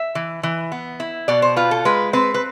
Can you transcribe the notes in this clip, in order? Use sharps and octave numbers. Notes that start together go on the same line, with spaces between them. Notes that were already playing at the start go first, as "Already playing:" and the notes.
Already playing: E5
E3
E3
B3
E4
B2 D5
C5
F4 B4
A4
G#3 B4
C4 B4
B4